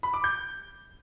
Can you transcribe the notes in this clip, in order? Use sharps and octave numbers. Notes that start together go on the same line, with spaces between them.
B5
D6
G6